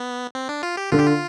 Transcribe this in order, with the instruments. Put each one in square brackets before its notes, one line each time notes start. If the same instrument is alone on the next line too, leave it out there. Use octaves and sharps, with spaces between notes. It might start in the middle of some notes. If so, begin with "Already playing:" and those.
Already playing: [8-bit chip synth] B3
C4
D4
F4
G4
[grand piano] D3 [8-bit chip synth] F4
[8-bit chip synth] G4
F4